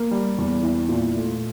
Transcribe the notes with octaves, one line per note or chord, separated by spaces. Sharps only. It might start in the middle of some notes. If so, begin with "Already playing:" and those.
Already playing: A#3
G3
E2
E3
A#2
A3